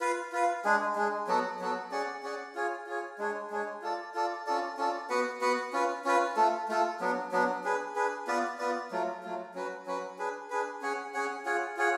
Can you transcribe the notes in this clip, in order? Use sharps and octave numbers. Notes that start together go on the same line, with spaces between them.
F4 B4 F5
F4 B4 F5
G#3 D4 G#4
G#3 D4 G#4
F#3 B3 F#4 A4
F#3 B3 F#4 A4
C#4 G#4 D5 F#5
C#4 G#4 D5 F#5
F4 G#4 C#5
F4 G#4 C#5
G#3 D4 G#4 C#5
G#3 D4 G#4 C#5
F4 A4 D5
F4 A4 D5
C#4 F4 A4 D5
C#4 F4 A4 D5
B3 F#4 B4 F#5
B3 F#4 B4 F#5
C#4 F4 B4
C#4 F4 B4
A3 F4 A4
A3 F4 A4
F#3 B3 D4
F#3 B3 D4
D4 G#4 B4
D4 G#4 B4
B3 F4 B4 D5
B3 F4 B4 D5
F#3 A3 F4
F#3 A3 F4
F#3 C#4 F#4 B4
F#3 C#4 F#4 B4
D4 G#4 B4
D4 G#4 B4
C#4 G#4 C#5 F#5
C#4 G#4 C#5 F#5
F4 G#4 C#5 F#5
F4 G#4 C#5 F#5